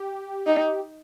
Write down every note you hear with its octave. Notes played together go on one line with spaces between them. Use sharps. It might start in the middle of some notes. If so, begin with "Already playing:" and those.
Already playing: G4
D#4